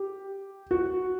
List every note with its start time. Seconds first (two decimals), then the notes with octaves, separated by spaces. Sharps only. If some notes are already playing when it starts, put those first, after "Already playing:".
Already playing: G4
0.71 F#4